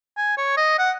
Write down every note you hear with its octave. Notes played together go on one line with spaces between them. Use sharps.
G#5
C#5
D#5
F#5